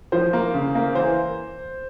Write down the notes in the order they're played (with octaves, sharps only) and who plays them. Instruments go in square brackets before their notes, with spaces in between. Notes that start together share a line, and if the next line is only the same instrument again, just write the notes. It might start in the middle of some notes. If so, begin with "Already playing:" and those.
[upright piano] F3 [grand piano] C5
[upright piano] A#3
C#3
A#3
[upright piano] E3 [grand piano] C5